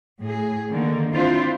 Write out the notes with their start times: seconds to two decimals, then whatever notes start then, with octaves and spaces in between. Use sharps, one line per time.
0.21 A2 G#4
0.69 D3 D#3 A#3
1.13 C4 D4 E4 F4 C5